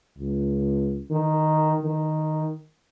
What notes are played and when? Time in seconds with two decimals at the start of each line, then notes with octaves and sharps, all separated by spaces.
0.18 C#2
1.11 D#3
1.83 D#3